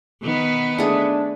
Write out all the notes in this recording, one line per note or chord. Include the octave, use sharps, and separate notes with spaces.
D#3 B3 B4
A3 D4 G#4